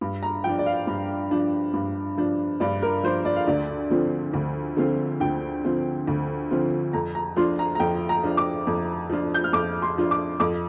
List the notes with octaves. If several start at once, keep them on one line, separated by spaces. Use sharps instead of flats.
G2
A#5
F3 D4 G5
D5
F5
G2
F3 D4
G2
F3 D4
G2 D5
A#4
F3 D4 C5
D5
F5
D2 D5
D3 F3 C4 F4
D2
D3 F3 C4 F4
D2 G5
D3 F3 C4 F4
D2
D3 F3 C4 F4
F2 A#5
A#5
F3 D4 F4 C6
A#5
A#5
F2 G5
A#5
F3 D4 F4
D6
F2
F3 D4 F4
G6
F6
F2 D6
C6
F3 D4 F4
D6
F2 D6